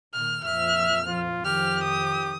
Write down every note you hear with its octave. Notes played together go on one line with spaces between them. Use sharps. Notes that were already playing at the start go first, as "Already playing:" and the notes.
A#2 D#3 F6
F2 A#2 F3 E5 F6
F4
F2 D#3 F3 G4 F6
D#6